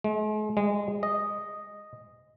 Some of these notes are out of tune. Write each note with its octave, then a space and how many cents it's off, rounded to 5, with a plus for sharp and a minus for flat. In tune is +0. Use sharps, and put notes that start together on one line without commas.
G#3 +45
G#3 -20
D#5 -5